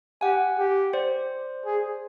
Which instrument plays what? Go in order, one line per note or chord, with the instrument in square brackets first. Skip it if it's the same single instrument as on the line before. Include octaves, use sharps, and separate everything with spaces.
[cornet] G4 [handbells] F#5 G#5
[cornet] G4
[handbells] C5 D5
[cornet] G#4